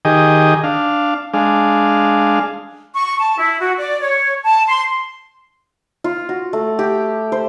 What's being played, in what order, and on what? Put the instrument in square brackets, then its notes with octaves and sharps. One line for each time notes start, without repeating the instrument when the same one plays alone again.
[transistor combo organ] D#3 G4 G#4 D#5
D4 F5
G#3 D4 F5
[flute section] C#6
A5
E4
F#4
D5
C#5
A5
C6
[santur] F4
F#4
A3
G4
C5